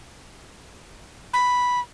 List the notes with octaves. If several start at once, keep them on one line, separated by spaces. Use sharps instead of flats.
B5